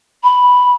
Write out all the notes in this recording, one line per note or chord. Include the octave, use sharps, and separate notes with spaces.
B5